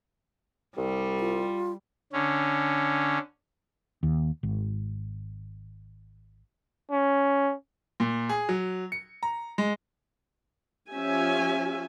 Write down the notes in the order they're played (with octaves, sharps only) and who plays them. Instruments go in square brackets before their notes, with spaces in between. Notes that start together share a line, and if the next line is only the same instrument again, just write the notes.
[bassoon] C2 [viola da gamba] G3
[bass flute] F4
[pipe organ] D3 C#4
[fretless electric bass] D#2
G#1
[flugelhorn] C#4
[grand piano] A#2
G#4
F#3
C#7
A#5
G#3
[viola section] F3 C#4 G4 E5 G#5